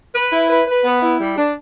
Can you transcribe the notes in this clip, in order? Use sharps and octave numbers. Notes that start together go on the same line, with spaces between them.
B4
E4
B4
B4
B3
E4
G3
D4